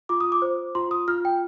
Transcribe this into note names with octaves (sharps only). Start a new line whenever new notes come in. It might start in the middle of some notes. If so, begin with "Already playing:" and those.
F4 D6
D#6
D6
C5
F4 C6
D#6
F4 F6
G5